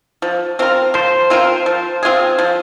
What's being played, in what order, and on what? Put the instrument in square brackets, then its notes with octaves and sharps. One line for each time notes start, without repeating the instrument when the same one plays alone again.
[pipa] F3
C4 F4 A#4
[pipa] F3 [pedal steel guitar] C5
[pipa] C4 F4 A#4
F3
C4 F4 G#4
F3